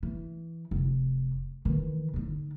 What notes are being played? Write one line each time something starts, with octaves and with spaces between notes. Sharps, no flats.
E3
F1
D#3 E3
D3 D#4